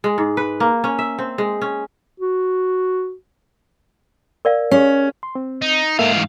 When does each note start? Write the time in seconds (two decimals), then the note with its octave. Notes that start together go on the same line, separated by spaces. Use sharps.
0.04 G#3
0.18 G#2
0.37 B4
0.60 A#3
0.84 C#4
0.99 E5
1.19 C4
1.38 G#3
1.62 C#4
2.20 F#4
4.45 A#4 D5 F5
4.71 C#4 G4 G#4
5.23 C6
5.35 C4
5.62 D#4
5.99 G#2 A#3 A4 E5 F5
6.12 E3 A3